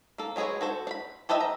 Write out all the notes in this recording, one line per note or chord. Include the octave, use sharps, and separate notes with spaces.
A#3 A4
F#3 G#3 G#4 B4 C#5
F#4 A4 C5
D4 B5
G4 A4 B4 D#5 E5
A#5